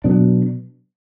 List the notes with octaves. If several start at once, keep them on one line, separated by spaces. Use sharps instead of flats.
B2 F#3 B3 D4